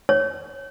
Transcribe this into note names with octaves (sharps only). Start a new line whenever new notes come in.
C#5